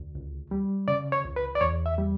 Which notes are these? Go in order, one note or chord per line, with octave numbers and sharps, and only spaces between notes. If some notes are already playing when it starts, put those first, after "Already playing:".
Already playing: D2
C#2
G3
C#3 D5
C#5
C#2
B4
D5
E2 C#5
E5
G3